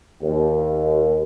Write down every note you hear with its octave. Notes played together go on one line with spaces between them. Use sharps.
D#2